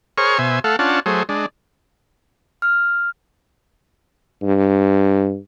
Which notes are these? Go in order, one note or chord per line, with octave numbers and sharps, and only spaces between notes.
G#4 A#4 C5 C#5 C#6 F6
B2 C5 E5 G#5
A3 A4 F5 F#5
C#4 D4 F4 F#5 A5
F#3 A3 G#4 C5
G#3 D4
F6
G2